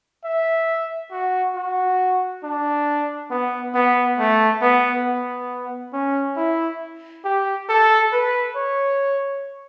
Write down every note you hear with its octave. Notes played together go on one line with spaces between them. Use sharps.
E5
F#4
F#4
D4
B3
B3
A3
B3
B3
C#4
E4
G4
A4
B4
C#5